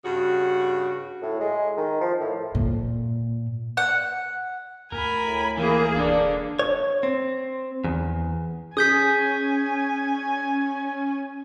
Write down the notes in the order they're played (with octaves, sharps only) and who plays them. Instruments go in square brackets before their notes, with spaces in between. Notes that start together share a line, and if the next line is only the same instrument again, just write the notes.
[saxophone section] G2 C#3 F#4
[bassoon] A2
G#3
D#3
F3
A2
[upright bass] A#2
[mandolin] F#5
[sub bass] D2 [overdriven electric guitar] A#4 [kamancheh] G#5 B5
[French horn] A2
[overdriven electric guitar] E3 [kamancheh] A#3 G#4 [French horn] A#4
[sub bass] E1 [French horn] D4 [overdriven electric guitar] A4 D5
[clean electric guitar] C#5
C4
E2
[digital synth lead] C#4 [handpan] G#4 [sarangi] G#5 [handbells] D#6 G6 B6